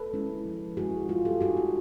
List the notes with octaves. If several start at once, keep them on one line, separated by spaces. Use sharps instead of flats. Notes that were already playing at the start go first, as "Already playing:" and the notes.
Already playing: A4 B4
G#3 C#4 E4
F3
G#3 C#4 E4 F#4 G#4
G3 F4
G4 A4
B3 D#4 F#4 G#4
F#4